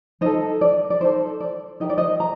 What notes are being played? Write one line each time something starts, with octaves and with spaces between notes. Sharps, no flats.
D#4 A4 C5 D#5
D5
D5
D#4 A4 C5
D5
D#4 G4 A#4 D#5
D5
C5 D#5
A#5